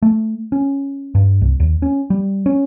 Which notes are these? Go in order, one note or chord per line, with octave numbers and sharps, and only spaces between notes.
A3
C#4
G2
C2
D#2
C#4
G3
C#4